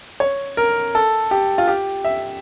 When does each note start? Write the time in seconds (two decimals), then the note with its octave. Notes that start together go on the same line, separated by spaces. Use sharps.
0.20 C#5
0.57 A#4
0.95 A4
1.31 G4
1.58 F4
1.68 G4
2.05 E5